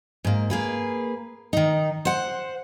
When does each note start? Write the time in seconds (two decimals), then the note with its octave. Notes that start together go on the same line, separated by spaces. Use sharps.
0.24 G#2 A#3
0.50 A#3 G#4 B4
1.53 D#3 D#4
2.05 C5 F#5